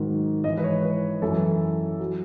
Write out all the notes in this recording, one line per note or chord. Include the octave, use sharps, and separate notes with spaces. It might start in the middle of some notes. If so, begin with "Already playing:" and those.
Already playing: G#2 D#3 F#3
G#2 E3 D#5
B4
C#5
B4
F#2 E3 A4
F#3